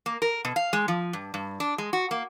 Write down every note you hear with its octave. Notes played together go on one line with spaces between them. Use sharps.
A#3
A#4
B2
F5
G#3
F3
G2
G2
D4
G#3
F#4
A#3